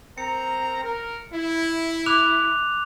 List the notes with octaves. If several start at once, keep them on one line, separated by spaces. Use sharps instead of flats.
C4 A#4 A#5 C#7
A#4
E4
D6 F#6 F7